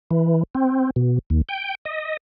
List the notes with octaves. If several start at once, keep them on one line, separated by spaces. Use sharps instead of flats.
E3
C4
B2
D#2
G5
D#5